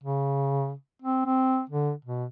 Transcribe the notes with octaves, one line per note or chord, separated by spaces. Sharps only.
C#3
C4
C4
D3
B2